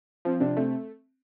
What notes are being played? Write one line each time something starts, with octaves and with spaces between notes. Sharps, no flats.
F3 C4
C3 D4
A3 C4